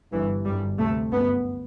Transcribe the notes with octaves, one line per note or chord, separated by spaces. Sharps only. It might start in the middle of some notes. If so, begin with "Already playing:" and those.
G1 G2 E3
G1 F#2 G3
D2 C3 A3
G1 F#2 B3